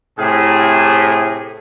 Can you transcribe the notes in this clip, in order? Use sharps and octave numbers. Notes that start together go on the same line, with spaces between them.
A2 C3 G#4